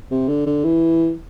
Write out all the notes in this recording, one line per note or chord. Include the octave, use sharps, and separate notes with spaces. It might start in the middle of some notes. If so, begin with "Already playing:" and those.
C3
D3
D3
E3